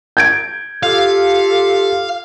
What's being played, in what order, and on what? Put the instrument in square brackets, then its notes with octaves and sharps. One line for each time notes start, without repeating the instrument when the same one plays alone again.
[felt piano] G6 G#6 D7
[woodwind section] F4 G4 A4 [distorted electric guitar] F5